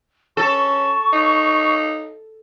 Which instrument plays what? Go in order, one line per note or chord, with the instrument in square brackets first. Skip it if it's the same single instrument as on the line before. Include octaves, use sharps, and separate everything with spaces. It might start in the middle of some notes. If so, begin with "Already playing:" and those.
[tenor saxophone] C#4 [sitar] A4 [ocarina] C#6
[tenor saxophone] D#4